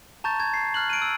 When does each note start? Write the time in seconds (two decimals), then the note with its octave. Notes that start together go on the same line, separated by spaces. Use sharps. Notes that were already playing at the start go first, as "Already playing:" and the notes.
0.24 A5 A#5 C#6 G6 A6
0.40 G#6
0.54 C7
0.74 F6 F#6 F#7
0.90 D7 D#7
1.02 E6